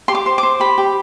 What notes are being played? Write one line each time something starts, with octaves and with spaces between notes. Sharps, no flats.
G4 C6
D6
C5
D6
C5
G4 B5
G4